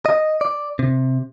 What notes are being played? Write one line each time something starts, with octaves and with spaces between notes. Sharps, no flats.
D#5
D5
C3